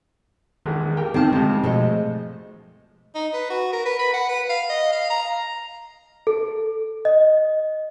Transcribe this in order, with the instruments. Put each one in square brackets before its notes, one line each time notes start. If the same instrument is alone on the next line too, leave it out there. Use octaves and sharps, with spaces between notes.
[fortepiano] A#1 E2 G#3 [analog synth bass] D#3
[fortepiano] G4 A#4 G5
[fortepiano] D#2 A2 D#3 [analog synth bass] D3 [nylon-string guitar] C4 A5
[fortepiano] F2 C3 [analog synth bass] G#3
[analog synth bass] B2 [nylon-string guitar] F3 A3 D#5 [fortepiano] G#3
[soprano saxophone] D#4
B4
F#4
A#4
B4
B5
F#5
B4
F5
D#5
F5
A#5
[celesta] A4
D#5